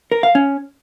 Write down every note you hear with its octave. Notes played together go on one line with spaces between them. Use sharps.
A#4
F5
C#4